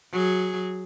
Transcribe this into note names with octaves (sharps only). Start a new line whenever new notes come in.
F#3 G#4